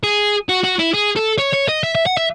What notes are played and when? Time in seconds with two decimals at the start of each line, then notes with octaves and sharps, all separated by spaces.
0.04 G#4
0.49 F#4
0.63 F#4
0.79 E4
0.94 G#4
1.16 A4
1.39 C#5
1.54 C#5
1.69 D#5
1.83 E5
1.95 E5
2.06 F#5
2.17 E5